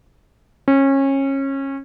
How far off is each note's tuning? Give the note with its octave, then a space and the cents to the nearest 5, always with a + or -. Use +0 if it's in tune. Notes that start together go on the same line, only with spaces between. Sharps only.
C#4 -25